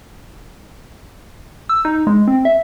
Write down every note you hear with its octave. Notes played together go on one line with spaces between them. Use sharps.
E6
D#4
G#3
C4
E5